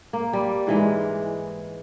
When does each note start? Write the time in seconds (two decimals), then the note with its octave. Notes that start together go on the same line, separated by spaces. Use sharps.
0.13 A#3
0.33 G3
0.67 G#2 E3 G#3